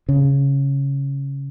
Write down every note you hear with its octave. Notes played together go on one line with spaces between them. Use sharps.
C#3